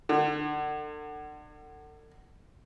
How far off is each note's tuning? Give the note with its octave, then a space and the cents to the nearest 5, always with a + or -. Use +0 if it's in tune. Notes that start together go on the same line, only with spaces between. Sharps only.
D3 +30